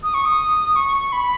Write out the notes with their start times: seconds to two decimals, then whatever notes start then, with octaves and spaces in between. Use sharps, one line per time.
0.03 D#6
0.14 C#6
0.25 D#6
0.76 C#6
1.12 B5